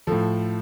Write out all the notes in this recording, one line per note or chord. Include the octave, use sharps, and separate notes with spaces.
A2 F3 A4